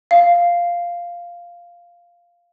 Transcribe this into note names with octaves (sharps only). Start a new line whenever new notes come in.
F5